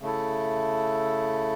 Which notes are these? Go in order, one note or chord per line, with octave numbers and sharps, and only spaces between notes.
C#3 A3 E4 A4